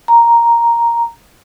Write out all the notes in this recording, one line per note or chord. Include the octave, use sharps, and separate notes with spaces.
A#5